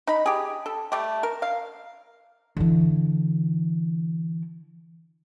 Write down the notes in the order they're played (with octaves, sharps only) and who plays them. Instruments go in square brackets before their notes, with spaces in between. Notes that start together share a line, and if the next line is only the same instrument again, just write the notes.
[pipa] D#4 B5
G4 G#4
A4
G3 A3 G4
A#4
F5
[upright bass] D3 E3